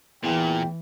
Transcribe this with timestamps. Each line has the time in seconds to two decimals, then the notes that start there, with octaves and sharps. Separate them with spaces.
0.24 E2 A#2 E3 G5